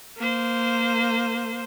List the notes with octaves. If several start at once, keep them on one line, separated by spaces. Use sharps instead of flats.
A#3 C5